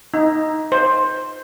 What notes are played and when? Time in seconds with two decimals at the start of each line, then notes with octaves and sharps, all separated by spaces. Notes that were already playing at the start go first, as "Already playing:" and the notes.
0.14 D#4
0.72 C5